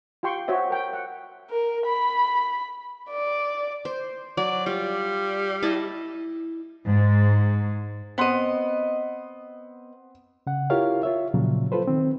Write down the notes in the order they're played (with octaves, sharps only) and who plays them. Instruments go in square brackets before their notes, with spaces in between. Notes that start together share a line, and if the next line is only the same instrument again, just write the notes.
[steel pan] F4 G4 G5 C6 C#6
F#4 C5 C#5 E5
A#4 G5
F#5
[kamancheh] A#4
B5
D5
[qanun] C5
[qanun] F#3 [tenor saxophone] D5
[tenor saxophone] G3 [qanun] F4
[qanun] E4 D#5 A5
[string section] G#2
[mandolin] B3 D#5 [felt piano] C4 F#5 C6
[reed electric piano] C#3 F#5
E4 F4 G4 A#4 C#5 F5
F4 C#5 E5
A#2 C#3 F3 F#3
F4 A4 B4 C5
D#3 C4